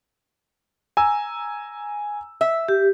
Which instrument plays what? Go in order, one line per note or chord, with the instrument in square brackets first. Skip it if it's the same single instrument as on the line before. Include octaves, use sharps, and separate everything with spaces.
[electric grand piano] G#5 A#5 E6
[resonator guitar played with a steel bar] E5
[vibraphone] G4